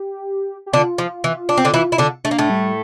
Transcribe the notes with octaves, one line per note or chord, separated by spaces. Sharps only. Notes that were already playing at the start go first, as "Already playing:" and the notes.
Already playing: G4
G4
D3 D4 F4
F3
E3
D4
C4
D3 D4
E3 E4
E4
D3 D4
A3 D4
A#3
A2 A3
G3